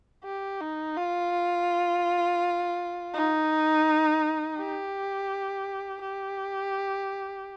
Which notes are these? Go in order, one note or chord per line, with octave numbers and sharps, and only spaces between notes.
G4
D#4
F4
D#4
G4
G4